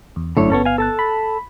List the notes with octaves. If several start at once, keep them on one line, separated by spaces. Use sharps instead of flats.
E2
G1 F#2 D3 A3 E4 C#5
G1 B3 C#4 A4 C#5
F5 G#5
A4 A5 F#6
B5